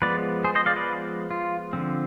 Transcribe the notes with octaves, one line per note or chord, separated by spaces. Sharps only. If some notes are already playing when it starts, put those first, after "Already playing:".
F3 G#3 B3 B4 D5
G#4 C5
C5 D#5
D5 F5
B4 D5
F4
D3 F3 C4